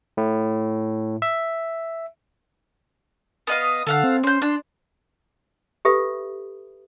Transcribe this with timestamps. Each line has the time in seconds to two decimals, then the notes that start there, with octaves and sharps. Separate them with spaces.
0.17 A2
1.22 E5
3.47 B3 D#5 F5
3.68 D#6
3.87 D3 A4 F5 F#5
4.04 C4
4.24 C#4 C5 G6
4.42 D4 C6
5.85 G4 A4 B4 E5 B5 D#6